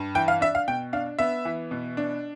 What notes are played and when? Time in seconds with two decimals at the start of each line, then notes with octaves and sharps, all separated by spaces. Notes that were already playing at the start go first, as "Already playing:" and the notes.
Already playing: G2
0.15 E3 G5
0.28 F5
0.41 D4 E5
0.55 F5
0.68 B2 G5
0.93 D4 F5
1.19 B3 E5
1.45 E3
1.71 B2
1.97 D4